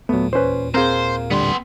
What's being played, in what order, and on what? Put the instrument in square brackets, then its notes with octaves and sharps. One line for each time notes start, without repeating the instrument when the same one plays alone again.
[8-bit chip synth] D#2 A#2 [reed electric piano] F#3 A3 [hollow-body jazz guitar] B3
[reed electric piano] E2 C#4 [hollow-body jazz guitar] B4 C5
[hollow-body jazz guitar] C4 G#4 [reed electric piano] A#4 F5 [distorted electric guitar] C5
[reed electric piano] A2 D3 G3 [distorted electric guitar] B3 C6